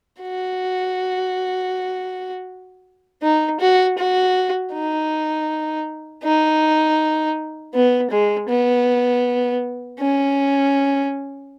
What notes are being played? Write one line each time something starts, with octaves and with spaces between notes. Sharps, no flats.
F#4
D#4
F#4
F#4
D#4
D#4
B3
G#3
B3
C#4